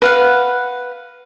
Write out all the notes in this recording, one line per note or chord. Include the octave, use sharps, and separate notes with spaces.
B4 F5 F#5